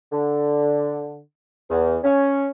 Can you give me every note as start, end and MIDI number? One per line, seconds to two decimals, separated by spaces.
0.12 1.19 50
1.70 1.98 40
2.03 2.49 61